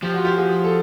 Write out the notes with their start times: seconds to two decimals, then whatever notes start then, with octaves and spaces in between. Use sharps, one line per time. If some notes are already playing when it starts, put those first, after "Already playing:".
0.02 F3 G4
0.14 F#4
0.24 F4 G4
0.38 F#4 G#4
0.64 A4